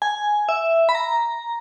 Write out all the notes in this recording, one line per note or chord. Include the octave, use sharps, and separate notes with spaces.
G#5
E5
B5
A#5